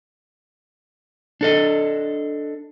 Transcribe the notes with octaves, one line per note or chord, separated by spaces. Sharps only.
D4 A4 D#5